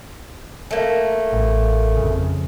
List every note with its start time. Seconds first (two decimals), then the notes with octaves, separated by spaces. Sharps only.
0.71 A3 A#3
1.33 A1
1.97 F2 C#3